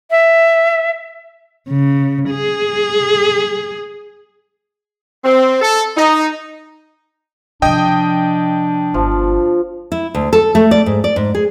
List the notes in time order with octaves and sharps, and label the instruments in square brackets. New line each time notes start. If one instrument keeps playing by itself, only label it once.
[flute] E5
[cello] C#3
G#4
[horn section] C4
A4
D#4
[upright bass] C3 F3 [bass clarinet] D4 [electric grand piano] D#5 G5 D#6
[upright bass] G1 [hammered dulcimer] F3
[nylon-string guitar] E4
D2
A4
A3
D5
G#2
D5
G#2
G#4